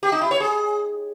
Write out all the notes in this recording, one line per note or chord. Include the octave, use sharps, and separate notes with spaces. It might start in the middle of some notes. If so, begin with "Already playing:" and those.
G4
D#4
E4
C#5
G#4